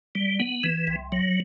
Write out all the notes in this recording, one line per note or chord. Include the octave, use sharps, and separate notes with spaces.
G3
B3
E3
C2
F#3